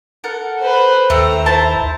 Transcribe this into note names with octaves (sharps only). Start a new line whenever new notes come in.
A4 A#4 F#5
B4 C5
D#2 A3 C4 E5 A#5
E4 C5 A5